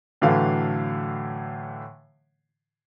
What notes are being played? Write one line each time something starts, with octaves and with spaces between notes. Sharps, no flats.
A2 D3 E3 F#3 A3 F5